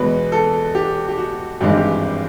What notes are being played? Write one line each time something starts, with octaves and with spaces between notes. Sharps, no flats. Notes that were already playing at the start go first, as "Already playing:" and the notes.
Already playing: E2 B2 G#3 B4
A4
G4
G4
F#4
G#1 G2 E3 G#3 C4 G4
G4
F#4